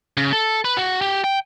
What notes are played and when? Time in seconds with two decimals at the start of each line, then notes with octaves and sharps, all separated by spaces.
0.17 C#3
0.33 A4
0.65 B4
0.77 F#4
1.01 G4
1.24 G5